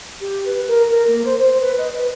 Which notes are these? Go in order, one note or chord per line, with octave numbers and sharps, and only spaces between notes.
G4
B4
A#4
A#4
A#3
C5
C5
B4
D#5
B4